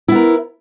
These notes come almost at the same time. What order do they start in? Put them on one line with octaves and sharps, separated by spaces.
E4 B3 A#4